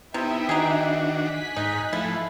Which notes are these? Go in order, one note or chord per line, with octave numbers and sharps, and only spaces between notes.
C3 B3 D#4 E4 B4 E5 G5
D#3 D4 D#4 F#4 G#4
G#5 F#6 B6
G#2 D#4
F3 A3 E4